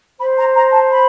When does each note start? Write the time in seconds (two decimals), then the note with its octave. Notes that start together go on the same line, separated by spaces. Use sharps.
0.19 C5 B5
0.38 A#5
0.56 A#5
0.73 A5
0.90 B5